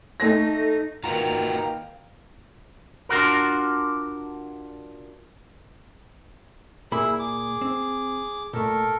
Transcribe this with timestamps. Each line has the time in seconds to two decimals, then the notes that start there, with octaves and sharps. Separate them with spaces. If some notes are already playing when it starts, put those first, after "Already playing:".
0.20 A3 D#4 A#6
1.04 D#3 A#3 F4 F#4 B4 F5 G5 A#5
3.09 D4 F4 F#4 A#4
6.92 A#2 A#3 E4 G#4 B5
7.19 G#4 D6
7.61 C4
8.53 A#2 A3 A4 A#4